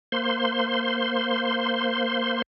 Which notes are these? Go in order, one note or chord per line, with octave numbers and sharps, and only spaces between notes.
A#3 C5 C6